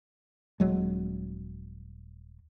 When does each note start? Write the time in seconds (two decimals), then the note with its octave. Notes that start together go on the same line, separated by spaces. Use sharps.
0.60 D#1 F#3 G#3